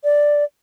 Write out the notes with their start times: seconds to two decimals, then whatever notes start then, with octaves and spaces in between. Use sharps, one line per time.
0.04 D5